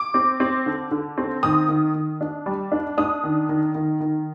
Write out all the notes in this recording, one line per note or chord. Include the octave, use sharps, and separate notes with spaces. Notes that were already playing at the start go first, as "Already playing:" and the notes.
Already playing: D6
C4
C4
D3
D3
C4
D#3 D#6
D#3
D#3
D4
G3
D4
D4 D#6
D#3
D#3
D#3
D#3